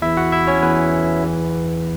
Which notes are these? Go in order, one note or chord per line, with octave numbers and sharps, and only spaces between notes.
E2 E3 E4 E5
F#4 F#5
E4 E5
C#4 C#5
E2 E3 B3 B4
E2 E3